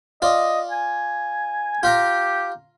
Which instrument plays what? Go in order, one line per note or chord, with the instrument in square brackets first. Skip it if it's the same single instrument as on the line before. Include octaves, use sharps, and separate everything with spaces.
[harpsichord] F4 D5 [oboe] D#5
[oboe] G#5
[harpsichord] F4 F5 A#5 [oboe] G4